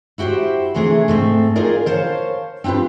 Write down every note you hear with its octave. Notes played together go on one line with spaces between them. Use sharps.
E4 F#4 G4 A#4 C5
C3 E3 A3 D4 G#4
G#2 A3 C4
A#3 D#4 F4 G#4 A#4 D5
A#4 C5 C#5 F5 F#5 A5
C4 D4 F4 G4 B4